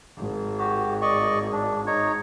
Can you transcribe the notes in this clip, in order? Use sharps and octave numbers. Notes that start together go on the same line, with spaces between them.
G#1
F#4 G4
D5 D#5 C#6
D4
D#4 C#5